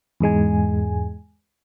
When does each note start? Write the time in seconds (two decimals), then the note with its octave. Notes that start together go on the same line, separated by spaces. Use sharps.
0.20 E2 G#2 G#3 G#5